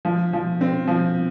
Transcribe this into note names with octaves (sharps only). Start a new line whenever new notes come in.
F3
F3
C4
F3